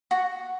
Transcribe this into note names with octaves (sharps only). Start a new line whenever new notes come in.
F#4